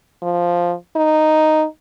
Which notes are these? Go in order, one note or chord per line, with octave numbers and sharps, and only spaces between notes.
F3
D#4